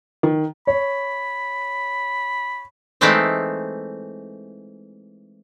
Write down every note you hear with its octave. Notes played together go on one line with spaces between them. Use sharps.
D#3
C#5 B5
E3 G#3 A3 C4 D#4 E4